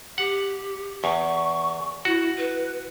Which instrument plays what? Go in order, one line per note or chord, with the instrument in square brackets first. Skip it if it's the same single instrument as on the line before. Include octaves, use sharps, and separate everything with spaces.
[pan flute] G4 [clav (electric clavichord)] F#5
[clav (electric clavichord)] E2 [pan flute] C#6
[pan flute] E4 [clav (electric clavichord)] F#4
[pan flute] B4